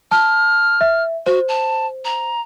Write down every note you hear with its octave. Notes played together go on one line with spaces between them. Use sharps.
A5 F6
E5
F#4 C5
A5
A#5